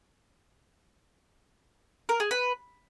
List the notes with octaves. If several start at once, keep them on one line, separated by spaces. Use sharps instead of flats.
A#4
G#4
B4